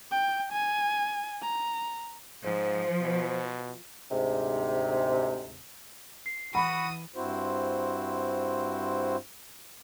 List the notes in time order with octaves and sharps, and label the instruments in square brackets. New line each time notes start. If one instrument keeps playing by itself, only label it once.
[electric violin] G5
G#5
A#5
[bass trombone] G#2 [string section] F3 [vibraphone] C5
[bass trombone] B2
[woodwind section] D2 G#2 C3
[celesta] C7
[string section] E3 D#6 [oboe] F#4 [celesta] F#5 [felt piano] B5
[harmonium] G2 C4 E4 F#4 C5